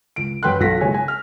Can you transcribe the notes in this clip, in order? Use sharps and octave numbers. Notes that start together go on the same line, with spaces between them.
C#2 D7
F#2 B4 G5 C6 F#6
B1 F4 A4 A#6 B6
F#1 G#3 C#5 G#5
G#5
F6